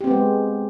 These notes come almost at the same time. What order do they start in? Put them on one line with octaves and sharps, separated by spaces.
G4 C4 B3 G#3